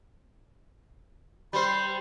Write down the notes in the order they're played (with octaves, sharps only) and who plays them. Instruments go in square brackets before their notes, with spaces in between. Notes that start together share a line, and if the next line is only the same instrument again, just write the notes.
[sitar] G3 C5 [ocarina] B5